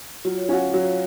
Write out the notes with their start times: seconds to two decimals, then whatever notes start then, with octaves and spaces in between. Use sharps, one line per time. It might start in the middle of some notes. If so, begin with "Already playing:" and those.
0.25 F#3 F4
0.37 C#5
0.49 C#4 F#4 F5
0.73 F#3 C#5